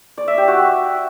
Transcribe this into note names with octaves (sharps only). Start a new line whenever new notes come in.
D5
E5
G4
F#4
E5